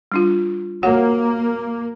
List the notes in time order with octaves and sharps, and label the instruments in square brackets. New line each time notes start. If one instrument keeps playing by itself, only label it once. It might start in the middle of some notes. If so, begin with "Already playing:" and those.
[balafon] G3 D4 F4
[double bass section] A#3 [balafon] F#4 C#5 F#5